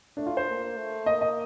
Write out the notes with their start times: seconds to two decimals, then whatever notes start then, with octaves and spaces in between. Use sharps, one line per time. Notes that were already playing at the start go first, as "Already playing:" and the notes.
0.17 A3 D4
0.26 F4
0.37 C5
0.47 A#3
0.77 A3
1.06 A#3 D#5
1.21 D#5